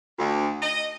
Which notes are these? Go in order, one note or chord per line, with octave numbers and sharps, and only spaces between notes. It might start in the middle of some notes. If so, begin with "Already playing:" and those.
D2
D#5